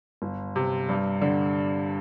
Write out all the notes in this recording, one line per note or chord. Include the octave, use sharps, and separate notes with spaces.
G1
C3
G2
D3